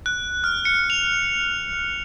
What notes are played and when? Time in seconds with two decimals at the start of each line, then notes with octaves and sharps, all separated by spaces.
0.06 F#6
0.44 F6
0.65 C#7
0.90 F7